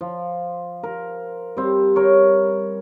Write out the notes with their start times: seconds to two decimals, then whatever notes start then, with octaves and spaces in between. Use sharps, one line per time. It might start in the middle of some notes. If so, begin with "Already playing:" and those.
0.01 F3
0.83 A#4
1.57 G3 C4
1.96 A#4 C#5